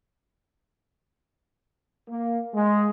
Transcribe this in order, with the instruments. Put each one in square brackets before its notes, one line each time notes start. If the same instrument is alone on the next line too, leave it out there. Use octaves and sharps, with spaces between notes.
[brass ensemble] A#3
G#3